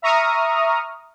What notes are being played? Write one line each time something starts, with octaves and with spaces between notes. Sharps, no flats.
E5 A#5 C#6 D#6 F6